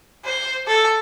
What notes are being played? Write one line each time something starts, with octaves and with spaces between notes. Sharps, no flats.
C5
A4